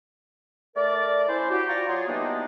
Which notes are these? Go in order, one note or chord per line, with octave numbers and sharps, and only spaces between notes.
A3 A#4 D5
C#4 E4 C5
F#4 G4
F4 D5 A#5 C#6
F#3 F4 G#4 C6
E3 G3 A#3 B3 D4 D#4